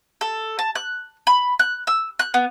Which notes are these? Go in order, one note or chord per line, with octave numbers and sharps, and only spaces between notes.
A4
A5
F#6
B5
F#6
E6
F#6
B3